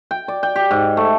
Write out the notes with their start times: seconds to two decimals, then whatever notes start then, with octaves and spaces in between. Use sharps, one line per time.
0.11 G5
0.28 D5
0.43 G5
0.56 G4
0.71 G#2
0.97 A3